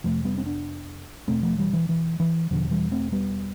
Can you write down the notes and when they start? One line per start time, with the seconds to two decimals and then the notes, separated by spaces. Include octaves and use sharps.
0.04 F2 C3 F3 A3
0.25 G3 B3
0.38 C4
0.45 B3 D4
1.27 E2 B2 A3 C4
1.43 F3 A3
1.58 E3 G3
1.73 E3
1.89 E3
2.20 E3
2.51 E2 B2 D3 F3
2.71 E3 G3
2.91 A3 C4
3.12 G3 B3